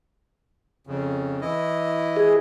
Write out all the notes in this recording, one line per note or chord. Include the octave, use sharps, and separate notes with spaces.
F2 C#3
E3 E4 D#5
G#4